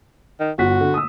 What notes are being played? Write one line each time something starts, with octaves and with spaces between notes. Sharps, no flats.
D#3
G1 F#4 B6
D3
D#6 E6